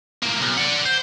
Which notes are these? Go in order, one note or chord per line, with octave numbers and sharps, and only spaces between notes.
A2 A#3
B1
D5 F#5
C5